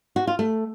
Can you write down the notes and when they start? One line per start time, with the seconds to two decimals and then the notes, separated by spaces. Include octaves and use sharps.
0.16 F#4
0.27 F4
0.39 A3